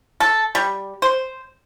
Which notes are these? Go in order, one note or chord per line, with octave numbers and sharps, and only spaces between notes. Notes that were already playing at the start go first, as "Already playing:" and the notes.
A4
G3
C5